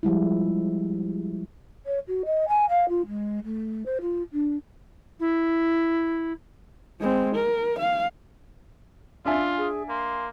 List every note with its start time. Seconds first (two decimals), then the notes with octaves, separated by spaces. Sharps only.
0.03 F3 G3 G#3 E4
1.85 C#5
2.07 F#4
2.25 D#5
2.47 G#5
2.69 F5
2.88 F4
3.07 G#3
3.43 A3
3.85 C5
4.01 F4
4.31 D4
5.20 E4
7.00 G#3 C4
7.35 A#4
7.79 F5
9.25 D4 F4 E5 G#5
9.58 G#4
9.89 A#3 C6